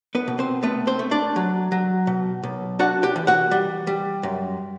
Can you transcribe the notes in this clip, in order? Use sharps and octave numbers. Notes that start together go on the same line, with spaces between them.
B3 B4
B2
C4 C5
A3 B3 B4
C4 C5
A3
D4 D5
F#3
F#3
B2
B1
D4 F#4 F#5
G4 G5
E3
F#4 F#5
G3
G3
F#2